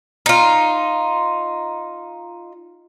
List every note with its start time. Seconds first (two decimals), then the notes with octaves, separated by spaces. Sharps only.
0.26 D#4 F4